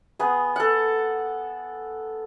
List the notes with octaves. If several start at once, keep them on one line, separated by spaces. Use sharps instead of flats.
B3 G#4
A4 F#5